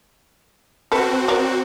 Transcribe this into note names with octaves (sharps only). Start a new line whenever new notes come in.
C4 F#4 A4 B4
A#4 C#5 D5